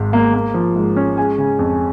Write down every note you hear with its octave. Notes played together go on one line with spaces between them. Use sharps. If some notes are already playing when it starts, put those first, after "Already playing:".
Already playing: G#1 G#2
A#3
A#3
F3
G#2
C#4
G#3 G#5
C#3
F2